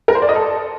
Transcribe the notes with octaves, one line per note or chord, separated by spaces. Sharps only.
A#4
C5
D5
D#5
A4